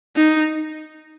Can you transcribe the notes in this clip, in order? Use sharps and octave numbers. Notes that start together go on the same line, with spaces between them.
D#4